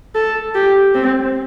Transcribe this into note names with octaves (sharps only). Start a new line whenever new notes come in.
A4
G4
C4